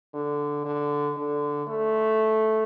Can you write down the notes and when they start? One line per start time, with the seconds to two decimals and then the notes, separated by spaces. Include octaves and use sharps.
0.14 D3
0.65 D3
1.17 D3
1.68 A3